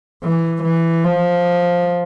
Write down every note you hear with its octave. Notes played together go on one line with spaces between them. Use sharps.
E3
E3
F3